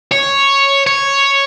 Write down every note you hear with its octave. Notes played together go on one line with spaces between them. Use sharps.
C#5
C#5